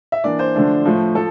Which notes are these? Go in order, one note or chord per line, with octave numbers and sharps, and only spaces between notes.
E5
E3 A#3 D4 D5
C5
D3 F3 A3 D4
A2 F3 A3
F3 A4